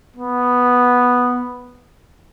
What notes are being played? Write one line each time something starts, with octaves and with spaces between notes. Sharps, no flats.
B3